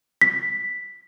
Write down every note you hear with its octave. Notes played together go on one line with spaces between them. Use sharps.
B6